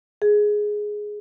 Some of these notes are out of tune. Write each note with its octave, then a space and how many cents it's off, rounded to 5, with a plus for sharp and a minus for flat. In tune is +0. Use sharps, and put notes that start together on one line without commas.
G#4 +5